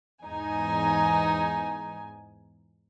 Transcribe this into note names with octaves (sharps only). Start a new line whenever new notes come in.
E2 G#2 D#4 G#5